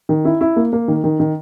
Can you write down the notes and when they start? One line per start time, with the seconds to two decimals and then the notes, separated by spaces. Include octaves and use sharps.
0.09 D#3
0.25 E4
0.41 E4
0.56 A#3
0.72 A#3
0.88 D#3
1.04 D#3
1.20 D#3